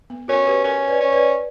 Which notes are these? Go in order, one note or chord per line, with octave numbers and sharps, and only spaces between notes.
B3
C#4 F#4 A#4
G4 B4
C#4 A#4 C#5
B4 D5
C#4
B4 D5